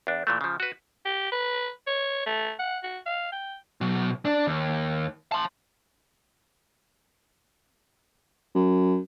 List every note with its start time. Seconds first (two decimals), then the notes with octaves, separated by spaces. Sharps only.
0.07 E2 D4
0.27 A#2 E3 A3
0.41 C#3 F3
0.60 F#4 B4
1.05 G4
1.32 B4
1.87 C#5
2.26 A3
2.59 F#5
2.83 F#4
3.06 F5
3.32 G5
3.81 B2 F#3
4.25 D4
4.47 D#2
5.32 A5 C6
8.55 F#2